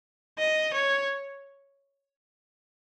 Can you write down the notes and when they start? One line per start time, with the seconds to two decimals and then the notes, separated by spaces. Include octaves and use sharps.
0.39 D#5
0.73 C#5